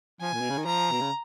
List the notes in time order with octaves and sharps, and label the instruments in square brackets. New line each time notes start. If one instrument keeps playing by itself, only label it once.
[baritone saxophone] F3 [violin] G#5
[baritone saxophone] A#2
B2
C#3
D#3
[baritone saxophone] F3 [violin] A#5
[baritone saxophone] B2
C#3